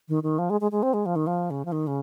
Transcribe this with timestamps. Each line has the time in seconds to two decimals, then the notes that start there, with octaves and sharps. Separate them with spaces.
0.08 D#3
0.23 D#3
0.38 F3
0.50 G#3
0.61 G#3
0.72 G#3
0.83 C4
0.94 G#3
1.06 F3
1.16 D#3
1.27 F3
1.50 C#3
1.65 F3
1.72 D#3
1.87 C#3